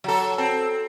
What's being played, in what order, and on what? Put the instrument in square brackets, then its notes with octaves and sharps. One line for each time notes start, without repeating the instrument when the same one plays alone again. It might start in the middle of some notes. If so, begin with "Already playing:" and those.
[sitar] F#3 A4
[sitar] C4 [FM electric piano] A4